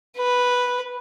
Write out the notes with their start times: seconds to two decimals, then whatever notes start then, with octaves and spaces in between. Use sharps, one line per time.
0.17 B4